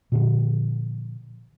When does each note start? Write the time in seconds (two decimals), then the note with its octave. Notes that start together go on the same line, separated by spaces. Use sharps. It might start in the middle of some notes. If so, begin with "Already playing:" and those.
0.12 A#2 D3 F3